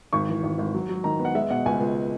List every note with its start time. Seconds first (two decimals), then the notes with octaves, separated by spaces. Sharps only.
0.13 G#1 C#6
0.29 E3
0.43 G#1
0.58 G#1
0.74 F#3
0.89 F#3
1.04 D#3 A#5
1.19 B3
1.25 F#5
1.35 G#3 E5
1.50 B2 F#5
1.66 C#2 G#5
1.80 C#2